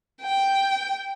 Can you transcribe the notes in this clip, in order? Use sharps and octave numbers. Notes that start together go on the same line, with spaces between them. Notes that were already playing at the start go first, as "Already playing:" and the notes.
G5